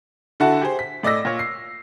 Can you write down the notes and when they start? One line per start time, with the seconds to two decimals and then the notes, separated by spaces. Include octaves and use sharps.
0.40 D3 E4 F#4 F#5 A5
0.61 G4 G#4 C5
0.79 B6
1.03 A2 D5 D#5 E6 A#6
1.25 A#2 C#5
1.39 C7